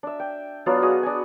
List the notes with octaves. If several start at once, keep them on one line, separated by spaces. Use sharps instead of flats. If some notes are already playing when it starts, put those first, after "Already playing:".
D4 E5
G5
F#3 B3 D4 F4
F#4 G#4 D#5
D4 G#5